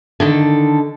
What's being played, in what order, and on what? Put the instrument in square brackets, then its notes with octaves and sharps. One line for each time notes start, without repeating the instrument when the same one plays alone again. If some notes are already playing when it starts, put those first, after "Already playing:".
[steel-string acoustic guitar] D3 D#3 A4